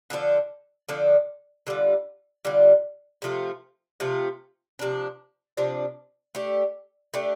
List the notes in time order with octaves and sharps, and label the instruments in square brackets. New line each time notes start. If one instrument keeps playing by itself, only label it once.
[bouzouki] D3 F3 D4 A4
D3 F3 D4 A4
D3 G3 F4
D3 G3 F4
C3 F3 A3 F4
C3 F3 A3 F4
C3 F3 D4
C3 F3 D4
A3 D4 G4
A3 D4 G4